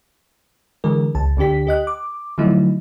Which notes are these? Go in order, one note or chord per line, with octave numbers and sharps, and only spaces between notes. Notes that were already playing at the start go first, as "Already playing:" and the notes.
D3 E3 G#3 A#4
C#2 A5
D2 D3 D4 G4 B6
G4 D#5 F#6
D6
D3 F3 F#3 A3 D#4 E4